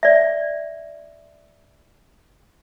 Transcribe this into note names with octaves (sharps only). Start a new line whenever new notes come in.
D5 E5